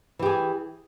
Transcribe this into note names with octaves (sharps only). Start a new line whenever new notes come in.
E3 G4 G#4